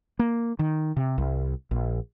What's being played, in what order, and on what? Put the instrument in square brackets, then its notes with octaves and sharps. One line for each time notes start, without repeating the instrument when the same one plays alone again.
[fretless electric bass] A#3
D#3
C3
C2
A#1